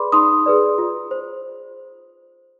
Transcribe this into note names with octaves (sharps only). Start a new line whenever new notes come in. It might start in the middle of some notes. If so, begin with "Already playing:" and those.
Already playing: G#4 B4 D5 B5 C6 D6
D#4 C6 D#6
G#4 B4 D5
F4
C5